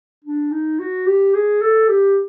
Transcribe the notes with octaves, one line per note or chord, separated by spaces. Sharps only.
D4
D#4
F#4
G4
G#4
A4
G4